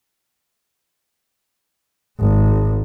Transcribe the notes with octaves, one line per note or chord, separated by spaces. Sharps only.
G#1